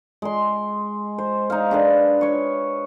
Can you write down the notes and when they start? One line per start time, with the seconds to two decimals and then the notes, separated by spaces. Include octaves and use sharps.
0.22 G#3 C6
1.18 C5
1.50 D#4 F5
1.71 D4 G#4 B4
2.21 C#5 C#6